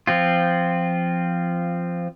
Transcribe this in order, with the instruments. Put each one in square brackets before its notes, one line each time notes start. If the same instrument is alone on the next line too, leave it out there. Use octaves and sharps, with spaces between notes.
[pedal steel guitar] F3 C4 F4